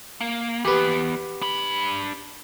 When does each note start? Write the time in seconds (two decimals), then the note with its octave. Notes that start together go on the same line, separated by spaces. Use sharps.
0.21 A#3
0.65 E3 B3 G4 B4
1.42 D4 B5